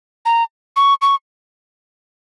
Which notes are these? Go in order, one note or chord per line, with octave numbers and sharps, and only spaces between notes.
A#5
C#6
C#6